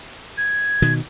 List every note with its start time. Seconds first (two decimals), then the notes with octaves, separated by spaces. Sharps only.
0.38 G#6
0.82 B2 D#3